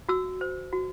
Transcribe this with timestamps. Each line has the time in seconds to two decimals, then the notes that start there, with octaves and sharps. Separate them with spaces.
0.09 F#4 E6
0.41 C5
0.73 F#4